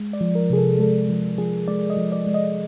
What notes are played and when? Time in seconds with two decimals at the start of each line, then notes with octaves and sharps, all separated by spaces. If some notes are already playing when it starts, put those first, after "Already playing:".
Already playing: G#3
0.13 D5
0.21 F3
0.35 A#4
0.50 C3 G#4
0.58 A4
0.79 G#3 A4
1.09 F3
1.38 F3 G#4
1.68 G#3 D5
1.90 D#5
1.97 F3
2.12 D5
2.26 G#3
2.34 D#5